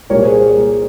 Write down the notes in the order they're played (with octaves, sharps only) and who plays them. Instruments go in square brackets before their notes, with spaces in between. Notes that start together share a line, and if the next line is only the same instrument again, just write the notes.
[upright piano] C2 A#2 G3 A#3 A#4 C#5
G#4 C5